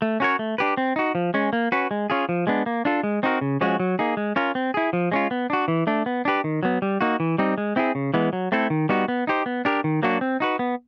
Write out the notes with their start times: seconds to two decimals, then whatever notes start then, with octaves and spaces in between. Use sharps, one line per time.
0.02 A3
0.20 C#4 F#4 A#4 C#5
0.39 A3
0.58 D4 G4 B4
0.77 C4
0.96 D#4 F#4
1.15 F3
1.34 G#3 C#4
1.53 A#3
1.72 C#4 F#4 B4
1.91 G#3
2.10 C#4 F4 G#4
2.29 F3
2.47 G#3 B3 D4
2.66 A#3
2.85 D4 F4 A4
3.03 G#3
3.23 C4 D#4 F#4 A#4
3.41 C#3
3.61 F3 G#3 C#4 F#4
3.80 F#3
3.99 A#3 D#4 G#4
4.17 G#3
4.36 C#4 F4 A#4
4.55 C4
4.74 E4 G#4
4.93 F3
5.12 G#3 C#4 F4
5.31 B3
5.50 D4 F#4
5.68 E3
5.87 A3 D4
6.06 B3
6.25 D4 G4 B4
6.44 D#3
6.63 F#3 B3
6.82 G3
7.01 A#3 D#4 F#4
7.20 E3
7.38 G3 C4 D#4
7.58 G#3
7.76 C4 E4 G#4
7.95 C#3
8.14 E3 G#3 B3
8.33 F#3
8.52 A3 C4 E4 A4
8.70 D#3
8.89 G3 B3 D#4 F#4
9.08 B3
9.27 D#4 G4 C5
9.46 B3
9.65 D4 G4 A#4
9.84 D#3
10.03 F#3 A#3 D4 F#4
10.21 C4
10.40 D#4 F#4 B4
10.59 B3